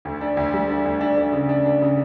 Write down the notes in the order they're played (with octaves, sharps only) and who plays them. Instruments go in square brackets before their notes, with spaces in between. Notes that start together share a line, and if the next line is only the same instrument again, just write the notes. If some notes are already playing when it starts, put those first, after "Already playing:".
[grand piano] D2
D4
D2
G3
D4
D2
D4
D4
C#3
D4
D4
C#3